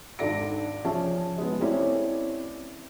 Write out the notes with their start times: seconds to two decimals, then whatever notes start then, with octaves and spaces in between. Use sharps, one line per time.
0.19 G#1 D4 A4 D5 A#6 D7
0.85 F3 C#4 G#4 E5 A5
1.38 G#3 B3
1.60 A3 C4 C#4 E4 C#5 D5